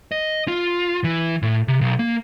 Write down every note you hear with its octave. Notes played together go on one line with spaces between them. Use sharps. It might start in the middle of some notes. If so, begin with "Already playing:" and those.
D#5
F4
E3
A2
C3
B1
A#3